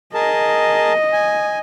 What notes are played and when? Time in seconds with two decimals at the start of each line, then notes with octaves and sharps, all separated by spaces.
0.14 G#4 A#4 D#5 A5
1.13 G#5